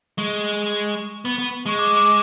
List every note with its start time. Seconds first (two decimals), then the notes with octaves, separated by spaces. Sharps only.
0.18 G#3 C#6
1.25 B3
1.38 B3
1.66 G#3 C#6
1.79 D6
1.97 D6